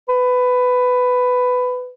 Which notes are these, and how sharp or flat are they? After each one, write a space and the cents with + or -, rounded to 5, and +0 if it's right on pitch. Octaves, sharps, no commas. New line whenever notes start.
B4 +15